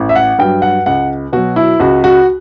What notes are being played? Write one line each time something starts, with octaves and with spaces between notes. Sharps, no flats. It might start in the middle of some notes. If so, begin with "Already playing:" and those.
Already playing: A1
E5
F#5
G2 F#3 G5
F#5
C#2 F#5
B2 F#3 F#4
E4
C#2 F#4
F#4